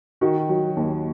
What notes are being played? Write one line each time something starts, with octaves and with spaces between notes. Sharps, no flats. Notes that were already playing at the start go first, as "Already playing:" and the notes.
D#3 F#4
F#3
D#2